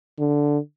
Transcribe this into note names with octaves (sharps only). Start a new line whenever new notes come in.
D3